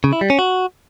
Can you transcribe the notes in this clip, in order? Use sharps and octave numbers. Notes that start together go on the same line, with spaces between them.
C#3
E4
G3
C#4
F#4